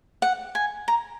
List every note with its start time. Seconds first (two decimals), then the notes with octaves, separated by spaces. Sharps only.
0.22 F#5
0.55 G#5
0.88 A#5